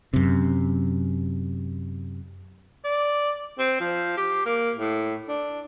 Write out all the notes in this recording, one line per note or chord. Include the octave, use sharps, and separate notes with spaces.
F#2 C3
D5
C4
F3
G4
A#3
A2
D4